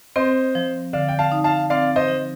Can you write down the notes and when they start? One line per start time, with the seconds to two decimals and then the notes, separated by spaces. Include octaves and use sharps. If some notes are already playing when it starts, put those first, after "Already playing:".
0.16 C4 C5 D#5
0.55 F3
0.93 D3 D5 F5
1.08 G5
1.19 F5 A5
1.32 D#4
1.44 F5 A5
1.70 C4 D5 F5
1.96 C5 D#5
2.08 F3